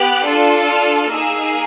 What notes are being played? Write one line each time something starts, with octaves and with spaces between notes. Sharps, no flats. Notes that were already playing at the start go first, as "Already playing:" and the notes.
Already playing: B3 G4 F#6
D4 F4 A4
F6
A#3 D#4 G#4 E6